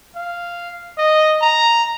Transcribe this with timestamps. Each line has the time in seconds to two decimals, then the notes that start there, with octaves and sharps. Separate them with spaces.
0.15 F5
0.98 D#5
1.42 A#5